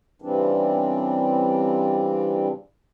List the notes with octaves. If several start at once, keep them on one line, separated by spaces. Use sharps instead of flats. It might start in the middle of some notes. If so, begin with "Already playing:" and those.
C#3 E3 G3 C4 D4